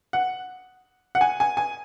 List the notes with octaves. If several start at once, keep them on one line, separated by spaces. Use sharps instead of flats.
F#5
F#5
G#5
G#5
G#5